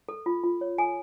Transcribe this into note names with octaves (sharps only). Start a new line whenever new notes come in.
A4
F4
F4
C#5
A4 G#5